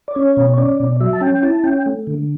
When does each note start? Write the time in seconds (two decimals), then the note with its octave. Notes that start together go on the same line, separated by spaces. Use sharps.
0.08 D5
0.15 C#4 C#5
0.37 B2
0.53 C#5
0.58 C#4 D5
0.80 B2
1.00 F#3 E5
1.13 A5
1.21 C#4 G5
1.43 E4 A5
1.64 C#4 G5
1.86 A3
2.07 D3